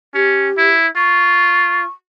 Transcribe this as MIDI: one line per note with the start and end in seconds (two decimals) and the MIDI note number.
0.15 0.49 61
0.15 0.70 67
0.58 0.87 64
0.96 1.84 65
0.96 1.87 85